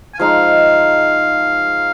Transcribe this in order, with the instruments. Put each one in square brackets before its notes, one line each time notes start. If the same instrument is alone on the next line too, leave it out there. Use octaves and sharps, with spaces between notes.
[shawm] G#5
[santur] F3 G#3 D#4 [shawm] F5